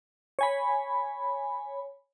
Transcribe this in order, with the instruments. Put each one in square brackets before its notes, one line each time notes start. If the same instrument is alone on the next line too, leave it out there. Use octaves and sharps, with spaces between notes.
[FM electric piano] C#5 G#5 B5